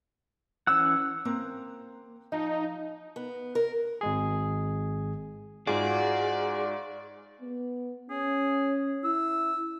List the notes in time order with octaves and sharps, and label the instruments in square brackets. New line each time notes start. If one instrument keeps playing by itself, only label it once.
[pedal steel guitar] E3 C#4 F#5 [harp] E6
[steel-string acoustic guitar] A#3 C4 A#5
[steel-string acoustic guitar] F3 [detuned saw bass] D#4
[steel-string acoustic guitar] B3
A#4
[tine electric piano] G#1 G#3 G#4
[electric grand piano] G#2 F4 [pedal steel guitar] F#4 D6 [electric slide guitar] G#4 [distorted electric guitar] D5
[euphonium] B3
[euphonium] C#4 [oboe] G#4
[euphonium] E4 [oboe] E6